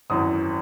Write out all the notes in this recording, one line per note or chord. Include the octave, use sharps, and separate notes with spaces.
G#1 F#2 E3 D#6